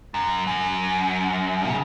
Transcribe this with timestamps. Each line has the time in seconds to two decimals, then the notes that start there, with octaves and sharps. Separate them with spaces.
0.14 F#2
0.47 F#2
1.69 C#3